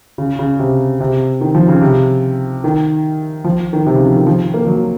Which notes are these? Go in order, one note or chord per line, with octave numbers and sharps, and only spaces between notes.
C#3
C#3
C3
C3
D#3
F3
C#3
C3
D#3
F3
D#3
C3
C#3
F3
D#3
F3
A#3
F#3